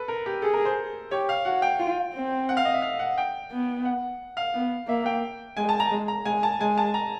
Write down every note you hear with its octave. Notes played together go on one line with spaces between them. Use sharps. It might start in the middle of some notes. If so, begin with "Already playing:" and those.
Already playing: A4 B4
A#4
G4
G#4 A4
A#4
C5
G4 C#5
F5
F#4 F#5
G5
F4
C4
F#5
F5
D#5
E5
F5
F#5
G5
B3
F#5
F5
B3
A#3 E5
G5
G#3 G#5
A5
A#5
G#3
A#5
G#3 G#5
A5
G#3 G#5
A5
A#5